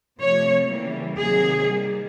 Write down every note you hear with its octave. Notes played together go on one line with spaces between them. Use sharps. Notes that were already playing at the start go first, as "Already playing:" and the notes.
C3 F3 A3 C#5
C#3 E3 G3 A#3
C3 D#3 F#3 A#3 G#4
D#3 G3 A#3